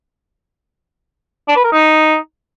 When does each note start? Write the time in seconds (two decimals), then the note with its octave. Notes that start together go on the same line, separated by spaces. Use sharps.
1.48 D4
1.56 B4
1.64 A#4
1.73 D#4